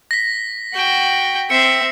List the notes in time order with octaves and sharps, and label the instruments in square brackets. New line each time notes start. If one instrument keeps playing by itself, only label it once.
[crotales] A#6 B6
[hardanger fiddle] F#4 G5
[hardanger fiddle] C4 E5 [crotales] C7 C#7